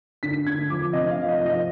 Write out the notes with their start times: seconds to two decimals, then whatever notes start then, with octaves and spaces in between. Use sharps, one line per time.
0.23 D3 B6
0.47 D3 G#6
0.70 F3 D6
0.93 C3 D#5
1.11 F5
1.17 F3
1.28 D#5
1.40 F3
1.46 D#5